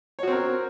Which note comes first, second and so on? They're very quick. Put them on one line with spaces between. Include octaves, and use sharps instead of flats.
C#5 F#4 C4 A#4